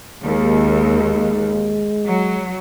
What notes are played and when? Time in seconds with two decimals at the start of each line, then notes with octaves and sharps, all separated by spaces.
0.24 D#2 G#3
2.06 F#3